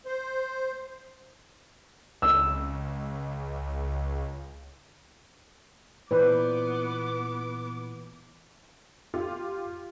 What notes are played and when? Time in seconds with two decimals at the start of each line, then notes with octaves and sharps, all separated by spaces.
0.06 C5
2.22 C#2 E6
6.11 A#2 E3 B3 B4 C5 D5 D6
9.14 F4 G4